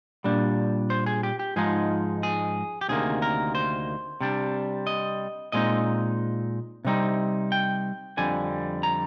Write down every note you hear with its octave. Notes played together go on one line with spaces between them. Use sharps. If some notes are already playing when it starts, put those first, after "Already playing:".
A#2 G3 D4
C5
G#4
G4
G4
G#2 F3 G#3 D#4 G#4
G#4
G4
D2 C3 D#3 A#3 G#4
A#4
C5
C3 G3 D4
D#5
A#2 G#3 C4 D#4 D#5
C3 G3 C4 D#4
G5
F2 D3 G3 G#5
A#5